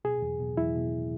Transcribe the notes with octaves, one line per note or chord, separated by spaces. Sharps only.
B2 G#4
E2
B2
E2 E4
B2